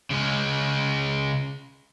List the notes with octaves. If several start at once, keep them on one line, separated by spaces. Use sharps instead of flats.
C#3 G#3